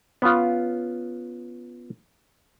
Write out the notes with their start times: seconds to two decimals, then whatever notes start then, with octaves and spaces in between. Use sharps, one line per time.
0.22 B3 C#4 F4